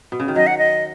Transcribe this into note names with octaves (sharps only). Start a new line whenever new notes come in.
B2
C#3
D#3
F#3 D#5
F#5
D#5